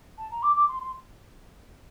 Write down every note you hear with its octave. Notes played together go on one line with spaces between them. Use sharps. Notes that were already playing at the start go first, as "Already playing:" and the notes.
A5
A#5
D6
D6
C6
C6